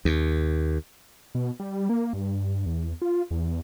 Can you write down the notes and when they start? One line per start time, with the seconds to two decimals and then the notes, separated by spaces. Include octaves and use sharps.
0.05 D#2
1.35 B2
1.60 G3
1.89 A#3
2.13 G2
2.66 E2
3.02 F4
3.31 E2